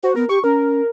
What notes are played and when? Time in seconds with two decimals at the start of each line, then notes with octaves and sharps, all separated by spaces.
0.03 F#4 C5
0.16 B3 A#4
0.29 G4 C#6
0.44 C#4 A#4